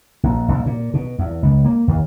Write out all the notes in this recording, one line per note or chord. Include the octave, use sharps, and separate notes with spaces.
A#1
A#1
A#2
B2
E2
C#2
A#3
D#2